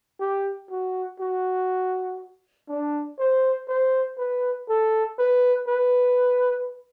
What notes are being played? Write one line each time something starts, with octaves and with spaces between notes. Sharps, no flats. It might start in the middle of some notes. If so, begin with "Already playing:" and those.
G4
F#4
F#4
D4
C5
C5
B4
A4
B4
B4